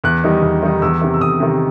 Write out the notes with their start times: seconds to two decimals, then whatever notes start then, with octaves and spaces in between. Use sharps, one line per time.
0.04 E2 F#6
0.24 D#3 G3 D#4
0.43 E2
0.62 D#3 G3 D#4
0.82 E2 E6
1.01 C3 D#3
1.14 E6
1.21 E2 D#6
1.40 C3 D#3